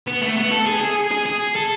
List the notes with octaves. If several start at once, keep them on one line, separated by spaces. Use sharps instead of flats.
B3
A3
B3
A4
G#4
G#4
G#4
G#4
A4